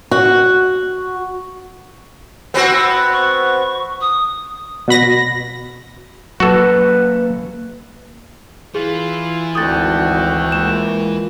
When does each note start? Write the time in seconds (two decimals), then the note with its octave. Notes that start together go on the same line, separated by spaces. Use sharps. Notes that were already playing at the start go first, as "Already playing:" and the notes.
0.11 F#4
2.54 B3 C4 F#4
3.13 C#6
4.01 D#6
4.88 B2 F#4 B5 A#6
6.40 F#3 A#3 F#4 A4 B4
8.75 E3 F4 G#4
9.55 G#1 D2 D3 F#4 G5 D#6 A6
10.52 G#3 A#3 F4 E7